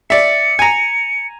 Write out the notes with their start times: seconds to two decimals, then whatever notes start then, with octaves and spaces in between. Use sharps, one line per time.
0.10 D5 E5 C#7
0.59 G#5 A#5